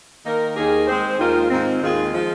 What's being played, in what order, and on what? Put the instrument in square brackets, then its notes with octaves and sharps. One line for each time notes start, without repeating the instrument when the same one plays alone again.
[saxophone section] D#3 A#3 D#4 A#4
D#2 D#3 A#3 G#4
G#3 C4 G#4 C5
D#2 D#3 G#3 F4 A#4
G#2 D#3 C4
D#2 D#3 G#3 F4 G#4
F3 G#3 F4